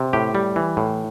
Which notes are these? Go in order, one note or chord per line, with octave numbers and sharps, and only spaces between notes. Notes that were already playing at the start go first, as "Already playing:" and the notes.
Already playing: C3
A2 G4
G3
E3
A2